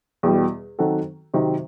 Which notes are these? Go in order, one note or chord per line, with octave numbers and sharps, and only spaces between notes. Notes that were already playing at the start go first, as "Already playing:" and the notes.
E2 B2 G3
D#3 F#3 C4 F#4 A4
C3 D#3 F#3 C4